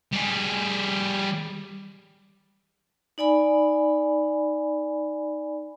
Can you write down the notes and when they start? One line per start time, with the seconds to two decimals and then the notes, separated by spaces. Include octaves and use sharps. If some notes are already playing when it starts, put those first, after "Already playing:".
0.13 G3 G#4
3.18 D#4 D5 G#5 B5